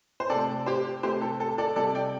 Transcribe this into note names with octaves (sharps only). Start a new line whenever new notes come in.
C5
C3 A4 D5
A3
G4 C5
C3 A3 G4 C5
A4
A4
A4 D5
C3 G3 A4 D5
D5 G5